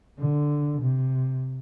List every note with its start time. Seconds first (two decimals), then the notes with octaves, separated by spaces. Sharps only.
0.19 D3
0.81 C3